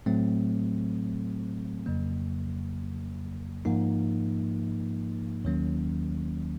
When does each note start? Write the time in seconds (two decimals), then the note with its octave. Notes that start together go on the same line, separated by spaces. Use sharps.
0.06 A2 F#3 A3 C4
1.86 F2 C#3 F#3 A#3
3.65 G#2 F3 A#3 D#4
5.45 D#2 D#3 F#3 A#3 C#4